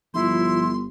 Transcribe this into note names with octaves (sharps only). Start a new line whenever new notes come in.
G1 F3 E4 C6